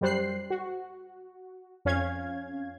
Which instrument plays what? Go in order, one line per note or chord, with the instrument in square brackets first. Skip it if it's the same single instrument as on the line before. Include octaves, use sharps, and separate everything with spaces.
[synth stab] F#2 G3 C5 F#6 C7
F#4
F2 C#4 F5 G#6